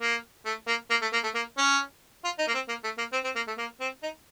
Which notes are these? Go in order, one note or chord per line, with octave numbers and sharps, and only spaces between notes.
A#3
A3
A#3
A#3
A3
A#3
A3
A#3
C#4
F4
D#4
A#3
C4
A#3
A3
A#3
C4
C4
A#3
A3
A#3
C4
D#4